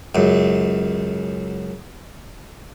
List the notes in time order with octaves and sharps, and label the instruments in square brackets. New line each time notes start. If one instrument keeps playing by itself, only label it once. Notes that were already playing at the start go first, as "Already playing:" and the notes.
[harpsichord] C#2 F#2